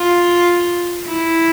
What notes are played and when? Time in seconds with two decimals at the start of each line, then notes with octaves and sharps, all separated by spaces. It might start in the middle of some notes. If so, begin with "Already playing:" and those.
Already playing: F4
1.08 E4